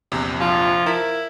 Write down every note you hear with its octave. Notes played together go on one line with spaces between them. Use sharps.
A#1 E2 C3
F3 F4
E4 A#4 B6